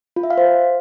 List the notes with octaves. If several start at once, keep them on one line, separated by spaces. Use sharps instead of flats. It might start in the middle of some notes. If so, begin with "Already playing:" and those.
F4
E5
F5
C5